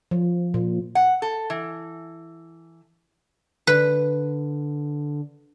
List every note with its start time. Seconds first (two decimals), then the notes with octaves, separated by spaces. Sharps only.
0.11 F3
0.54 A#2
0.95 F#5
1.22 A4
1.50 E3
3.67 D3 B4